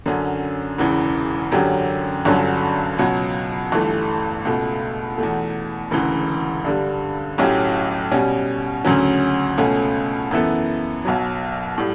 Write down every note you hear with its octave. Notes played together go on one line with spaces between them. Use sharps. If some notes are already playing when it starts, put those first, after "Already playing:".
F#2 D3 F#3 C#4
E1 E2 C#3 E3
F#2 D3 F#3 C#4 G4
G1 G2 D3 F#3 C#4
C#2 B2 F#3
G1 G2 E3 A3
C#2 B2 A3
E2 B2 A3
E1 D2 C#3 E3
G2 D3 G3
B1 A2 F#3 C#4 G4
B2 G3 C#4
D2 C#3 F#3 C#4
C#2 B2 A3 C#4
F#2 E3 B3 E4 A4
B1 B2 F#3
A2 G3